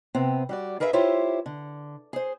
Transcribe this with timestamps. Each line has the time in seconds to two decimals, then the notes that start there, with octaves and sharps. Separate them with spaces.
0.15 C3 B3 C4
0.49 G3 F#4 D5
0.80 G#4 A#4 B4 D5 E5 F5
0.93 E4 F4 G4 C5 C#5 E5
1.46 D3
2.13 G#4 C5